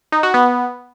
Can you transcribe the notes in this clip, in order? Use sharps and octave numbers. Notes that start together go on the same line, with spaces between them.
D#4
F#4
B3